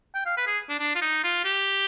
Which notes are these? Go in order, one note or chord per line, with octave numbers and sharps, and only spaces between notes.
G5
F5
B4
G#4
D4
D4
F4
D#4
F4
G4